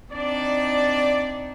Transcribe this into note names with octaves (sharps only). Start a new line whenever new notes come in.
C4 D4 D#4 D5